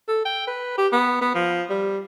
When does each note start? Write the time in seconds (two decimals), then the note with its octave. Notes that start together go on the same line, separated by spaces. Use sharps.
0.08 A4
0.25 G5
0.47 B4
0.78 G4
0.92 B3
1.21 B3
1.35 F3
1.70 G3